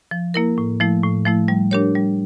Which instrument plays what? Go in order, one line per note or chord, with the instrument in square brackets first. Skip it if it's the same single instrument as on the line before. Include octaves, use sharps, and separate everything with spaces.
[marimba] F3
A#3 E4 A#4
A2
F3 A3 E4
A2
F3 A3 E4
G3
D4 G4 A#4 C#5
G3